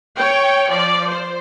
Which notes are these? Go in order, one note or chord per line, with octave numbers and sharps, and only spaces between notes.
C#5 G5
F3 D5
C5